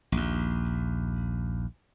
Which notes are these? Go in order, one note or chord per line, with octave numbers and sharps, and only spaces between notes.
A#1 D#2